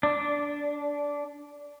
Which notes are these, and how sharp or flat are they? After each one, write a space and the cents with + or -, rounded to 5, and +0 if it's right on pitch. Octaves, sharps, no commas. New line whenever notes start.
D4 -15